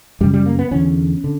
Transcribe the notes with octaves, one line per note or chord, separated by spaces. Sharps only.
F#2 C#3 G3
G3
A#3
B3
E2 D3 C#4
D3